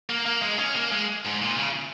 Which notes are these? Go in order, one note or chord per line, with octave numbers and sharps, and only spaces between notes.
A#3
A#3
G#3
C#4
A#3
G#3
G#2
A#2
C#3